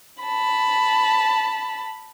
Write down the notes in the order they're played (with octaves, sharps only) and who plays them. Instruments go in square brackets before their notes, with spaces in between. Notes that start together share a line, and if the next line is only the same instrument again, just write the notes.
[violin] A5 B5